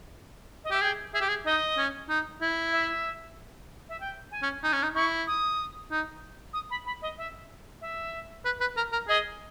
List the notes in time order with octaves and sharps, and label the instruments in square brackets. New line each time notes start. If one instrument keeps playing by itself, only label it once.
[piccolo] D#5
[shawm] G4 [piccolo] E5
[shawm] G#4 [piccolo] G5
[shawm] G#4 [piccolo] E5
[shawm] G4
G#4
[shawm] D#4 [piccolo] D#5
[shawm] C#4
D#4
E4
[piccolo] E5
E5
G5
G#5
[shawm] C#4
[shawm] D#4 [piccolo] G#5
[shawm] C#4
D#4
[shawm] E4 [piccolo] C#6
[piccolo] D#6
[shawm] D#4
[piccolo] D#6
B5
B5
D#5
E5
E5
[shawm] B4
B4
A#4
A#4
[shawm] G#4 [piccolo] D#5